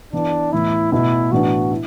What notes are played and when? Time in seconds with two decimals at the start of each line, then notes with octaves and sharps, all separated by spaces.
0.13 E3 B3 D4 E4
0.52 A2 E3 B3 E4
0.92 B2 A3 E4 F#4
1.32 A2 E3 B3 D4 F#4
1.71 E4